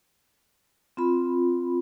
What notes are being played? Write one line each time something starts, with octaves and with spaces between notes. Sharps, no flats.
C4 F4 B5